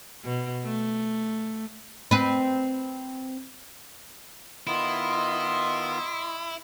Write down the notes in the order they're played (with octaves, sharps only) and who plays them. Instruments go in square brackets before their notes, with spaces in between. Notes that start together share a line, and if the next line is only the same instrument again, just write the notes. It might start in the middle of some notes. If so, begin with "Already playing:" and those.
[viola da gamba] B2
A3
[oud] C4 B4
[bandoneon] D#3 B3 F4 [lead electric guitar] E4 [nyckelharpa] D#5 C6